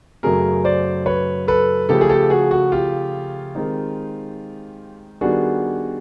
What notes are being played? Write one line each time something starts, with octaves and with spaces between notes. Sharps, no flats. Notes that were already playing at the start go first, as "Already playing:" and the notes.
F#2 C#3 F#3 A3 G#4 A#4
C5 D5
B4 C#5
A4 B4
C#3 F3 A3 G4 A4
G#4
G4 A4
F#4 G#4
F#4
F4 G4
D#3 G#3 C4 D#4
D#3 G3 B3 D4 F#4 G#4